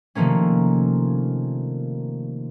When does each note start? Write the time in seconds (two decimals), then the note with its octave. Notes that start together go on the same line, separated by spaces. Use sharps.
0.15 C3 D#3 F3 A3 A#3 C#4